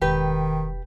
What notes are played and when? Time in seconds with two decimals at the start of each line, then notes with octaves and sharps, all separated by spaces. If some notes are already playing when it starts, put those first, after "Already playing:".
0.02 E1 D#3 G4 B4